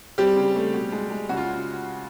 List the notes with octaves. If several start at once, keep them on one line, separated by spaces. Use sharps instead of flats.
G3 C4 G4
C#3
A3
B2
G#3
G#3
C#3 F#4
F4